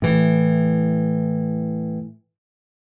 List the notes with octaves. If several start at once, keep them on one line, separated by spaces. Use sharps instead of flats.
A2 E3